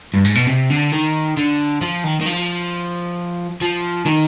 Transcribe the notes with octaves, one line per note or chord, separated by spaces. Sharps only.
G2
G#2
B2
C3
D3
D#3
D3
F3
D#3
D#3
F3
F3
D#3